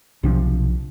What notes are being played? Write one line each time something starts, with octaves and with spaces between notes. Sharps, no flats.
B1 C3 F3 D4